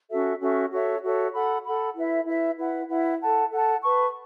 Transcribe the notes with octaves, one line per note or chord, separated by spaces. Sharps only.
C#4 F#4 A4 E5
C#4 F#4 A4 E5
F#4 A4 C#5 E5
F#4 A4 C#5 E5
A4 F#5 B5
A4 F#5 B5
E4 B4 E5
E4 B4 E5
E4 B4 F#5
E4 B4 F#5
A4 F#5 A5
A4 F#5 A5
B4 A5 C#6